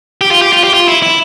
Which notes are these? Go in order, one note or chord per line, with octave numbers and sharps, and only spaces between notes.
G4
F4
G4
F4
G4
F4
E4
E4